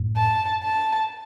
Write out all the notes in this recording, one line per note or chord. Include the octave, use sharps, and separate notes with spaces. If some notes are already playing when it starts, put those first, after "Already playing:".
Already playing: F#2 A2
A5
A5